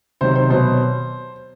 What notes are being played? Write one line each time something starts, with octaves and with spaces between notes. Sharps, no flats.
C3 D#3 F#3 C5
C5
B2 F#3 C5